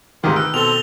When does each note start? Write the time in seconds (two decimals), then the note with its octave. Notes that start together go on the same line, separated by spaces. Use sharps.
0.23 D2 G#2 C3 D#3 F4 G4 A#4
0.36 A#4 B4 G5 E6 F#6
0.54 B2 C4 A4 F7 G7